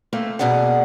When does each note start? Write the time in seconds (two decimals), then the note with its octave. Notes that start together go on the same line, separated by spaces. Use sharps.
0.13 A3 A#3 C4
0.39 B2 A#3 G#4 D5 F#5